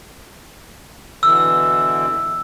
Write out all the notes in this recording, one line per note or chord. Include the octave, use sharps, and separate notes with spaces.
B2 D3 E3 E6